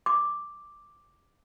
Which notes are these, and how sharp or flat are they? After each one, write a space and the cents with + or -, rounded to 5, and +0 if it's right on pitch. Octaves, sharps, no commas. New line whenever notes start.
D6 +0